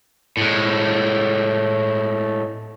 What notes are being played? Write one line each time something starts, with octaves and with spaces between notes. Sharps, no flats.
A2 G#3